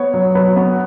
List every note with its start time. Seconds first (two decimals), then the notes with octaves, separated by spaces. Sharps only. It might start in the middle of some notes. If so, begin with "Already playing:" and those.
Already playing: B3 C#5
0.14 F#3
0.35 F#3 B4
0.56 B3